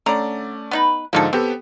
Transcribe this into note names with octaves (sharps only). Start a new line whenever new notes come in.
D3 A3 C#4 D5 A#5
B3 D#4 B4
G#2 D3 F3 A#3 D#4 A4
B3 C4 G4 A4